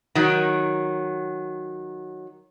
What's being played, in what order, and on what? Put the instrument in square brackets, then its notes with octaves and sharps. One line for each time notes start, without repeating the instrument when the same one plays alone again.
[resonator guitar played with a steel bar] D#3 F#3